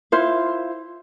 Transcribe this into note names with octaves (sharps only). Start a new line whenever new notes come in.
E4 F4 C5 F5